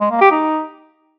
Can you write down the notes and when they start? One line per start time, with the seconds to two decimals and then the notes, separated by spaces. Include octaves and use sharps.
0.01 G#3
0.11 A#3
0.21 G4
0.31 D#4